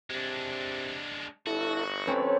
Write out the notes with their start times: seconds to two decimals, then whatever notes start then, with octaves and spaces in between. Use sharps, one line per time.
0.10 C3 G#3 D4
1.47 G1 E4 F#4 A4
2.07 C4 C#4 A4 B4 C#5